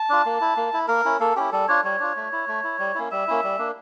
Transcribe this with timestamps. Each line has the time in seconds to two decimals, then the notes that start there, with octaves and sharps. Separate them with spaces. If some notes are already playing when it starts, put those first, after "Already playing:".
Already playing: A5
0.09 D4 F4
0.26 A#3
0.41 E4
0.57 A#3
0.73 E4
0.88 A#3 A#4
1.05 C#4 E4
1.20 A#3 A4
1.36 C#4 E4 G4
1.52 G3 A4
1.68 D4 F4 C#5
1.84 G3 C#5
2.00 D4 F4
2.16 A3
2.32 E4
2.48 A3
2.64 E4
2.79 G3
2.95 A#3 C#4 E4
3.11 G3 E5
3.28 A#3 C#4 E4
3.44 G3
3.59 A#3 D4